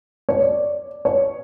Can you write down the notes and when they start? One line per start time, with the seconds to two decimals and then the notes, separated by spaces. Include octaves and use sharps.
0.29 C#5
0.40 D5
1.05 C#5